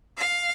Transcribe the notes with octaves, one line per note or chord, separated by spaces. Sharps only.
F5